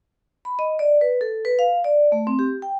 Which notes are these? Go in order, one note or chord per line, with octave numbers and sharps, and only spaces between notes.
B5
D#5
D5
B4
A4
B4
F5
D5
A3
C4
G4
G5